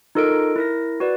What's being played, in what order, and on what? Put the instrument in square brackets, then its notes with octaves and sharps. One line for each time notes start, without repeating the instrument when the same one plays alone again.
[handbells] D#4 F4 A4 A#4 D#5 D7
E4 A#4 A#6
F#4 B4 D5